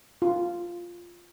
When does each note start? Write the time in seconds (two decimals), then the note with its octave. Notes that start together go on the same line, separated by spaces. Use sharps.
0.22 F4